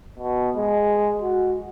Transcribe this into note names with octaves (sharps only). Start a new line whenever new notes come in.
B2
G#3
F#4